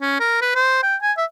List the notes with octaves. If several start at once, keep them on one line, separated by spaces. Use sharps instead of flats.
C#4
A#4
B4
C5
G5
G#5
E5